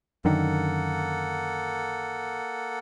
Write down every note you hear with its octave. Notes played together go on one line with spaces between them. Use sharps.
F#2 D3 D#3 A#3 A4 F#5